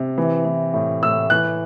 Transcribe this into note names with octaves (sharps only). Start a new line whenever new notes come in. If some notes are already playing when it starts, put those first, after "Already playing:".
Already playing: C3
E3
E3
A2
A2 E6
E3 F#6